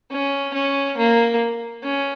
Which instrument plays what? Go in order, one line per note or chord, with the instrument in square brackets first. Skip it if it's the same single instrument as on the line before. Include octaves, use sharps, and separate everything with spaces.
[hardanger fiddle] C#4
C#4
A#3
C#4